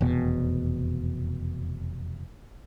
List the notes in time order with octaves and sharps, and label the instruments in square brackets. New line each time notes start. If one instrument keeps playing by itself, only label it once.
[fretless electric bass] F1 E2 B2